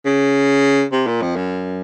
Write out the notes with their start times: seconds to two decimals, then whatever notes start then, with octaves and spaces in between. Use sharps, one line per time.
0.06 C#3
0.92 C3
1.07 A#2
1.22 F2
1.36 F#2